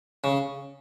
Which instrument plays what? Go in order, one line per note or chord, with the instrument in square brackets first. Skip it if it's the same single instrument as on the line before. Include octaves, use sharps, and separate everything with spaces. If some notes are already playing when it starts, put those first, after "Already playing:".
[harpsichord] C#3